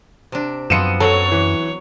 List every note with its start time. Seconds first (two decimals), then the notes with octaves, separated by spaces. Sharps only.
0.32 C3 D4
0.70 F#2 F3 B3 C4 C#7 D#7 E7
1.00 F#3 A4 C#5
1.32 E3